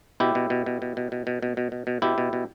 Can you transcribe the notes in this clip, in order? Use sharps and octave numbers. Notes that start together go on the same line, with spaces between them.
B2 E4 G4
B2
B2
B2
B2
B2
B2
B2
B2
B2
B2
B2
B2 E4 G4
B2
B2